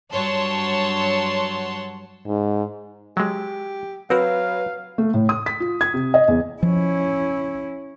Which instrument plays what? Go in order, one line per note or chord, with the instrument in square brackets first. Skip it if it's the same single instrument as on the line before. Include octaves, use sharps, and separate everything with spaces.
[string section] G2 F#3 C#5 F#5 A5 C6
[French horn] G#2
[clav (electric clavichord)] F#3 G#3 [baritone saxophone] G4
[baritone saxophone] F#3 [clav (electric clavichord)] C4 F#4 A#4 [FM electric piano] B4 [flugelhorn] F5
[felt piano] A3
A2
D#6
B6
F4
G#6
C3
D#5
E2
[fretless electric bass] F3 [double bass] C#4 E4